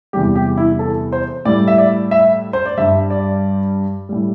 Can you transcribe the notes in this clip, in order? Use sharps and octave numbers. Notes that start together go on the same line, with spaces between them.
E2 C3 G3 G4
G4
E4
A4
C5
A2 G3 D5
E5
D5
E5
C5
D5
G2 G3 E5
D5
A2 G3